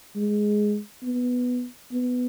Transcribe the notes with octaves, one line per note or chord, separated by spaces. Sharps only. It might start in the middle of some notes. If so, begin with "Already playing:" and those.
G#3
B3
B3